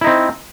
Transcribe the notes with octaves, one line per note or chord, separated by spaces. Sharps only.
C4 D#4 E4